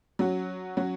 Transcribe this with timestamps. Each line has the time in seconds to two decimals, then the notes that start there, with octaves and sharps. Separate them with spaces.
0.19 F#3 C#4 F#4
0.77 F#3 C#4 F#4